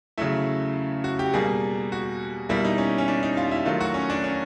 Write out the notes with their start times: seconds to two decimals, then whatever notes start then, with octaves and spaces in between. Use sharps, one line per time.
0.18 C#3 F#3 A3 E4
1.04 F#4
1.19 G4
1.33 B2 G3 A#3 G#4
1.92 F#4
2.49 B2 G3 A#3 E4
2.65 D#4
2.78 C#4
2.98 C#4
3.08 D4
3.23 D#4
3.37 F4
3.51 E4
3.65 D#3 F#3 A3 F4
3.81 F#4
3.94 C#4
4.10 D4
4.24 C#4